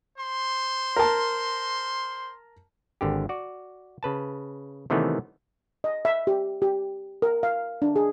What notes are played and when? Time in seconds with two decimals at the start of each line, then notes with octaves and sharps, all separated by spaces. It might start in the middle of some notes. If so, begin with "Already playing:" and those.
0.18 C5 C6
0.96 A#4 A5
3.01 G#1 D3 G4
3.29 F#4 D5
4.03 C#3 B4 A5
4.90 C3 D#3 E3 A3 B3 C#4
5.84 D#5
6.05 E5
6.27 G4
6.62 G4
7.22 A#4
7.43 F5
7.82 D4
7.96 G#4